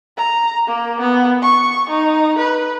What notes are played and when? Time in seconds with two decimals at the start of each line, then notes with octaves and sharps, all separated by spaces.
0.17 A#5
0.67 A#3
1.00 B3
1.43 C#6
1.89 D#4
2.38 B4